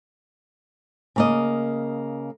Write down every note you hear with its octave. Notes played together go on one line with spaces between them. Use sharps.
C#3 A#3 D#5